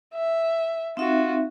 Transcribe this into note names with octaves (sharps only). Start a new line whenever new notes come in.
E5
C4 D#4 F4 F#4 E5